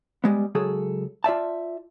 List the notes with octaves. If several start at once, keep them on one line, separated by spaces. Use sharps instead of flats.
G3 G#3 B3
C#2 F#3 G#4 A4
F4 D5 E5 A5